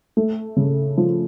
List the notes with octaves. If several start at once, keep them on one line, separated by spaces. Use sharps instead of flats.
A3
C#3
F3